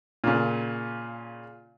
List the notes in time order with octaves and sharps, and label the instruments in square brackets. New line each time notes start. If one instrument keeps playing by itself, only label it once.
[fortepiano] A#2 C#3